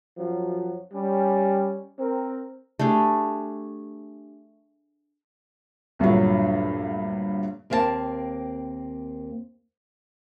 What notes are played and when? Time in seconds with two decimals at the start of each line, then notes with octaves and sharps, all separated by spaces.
0.18 F#2 F3 F#3
0.93 G3 C#4
1.98 C4 A#4
2.79 A3 D4 G4 G#4
5.99 D2 G2 A#2 F#3
7.70 D#2 A#3 C4 F5 A5